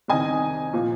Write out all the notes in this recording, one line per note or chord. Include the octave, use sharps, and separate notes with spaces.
C2 C3 D#3 D#5 G#5
A#2 F3